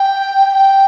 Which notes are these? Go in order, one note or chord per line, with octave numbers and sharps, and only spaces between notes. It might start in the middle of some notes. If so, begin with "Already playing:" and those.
Already playing: G5
G5